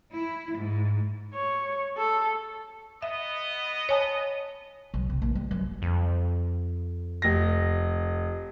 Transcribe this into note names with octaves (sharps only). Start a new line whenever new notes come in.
E4
G#2
C#5
A4
B3 D#5 E5
C#5 G#5 A5
B1
C3
A#1
G3
F#2
F2
F1 A#6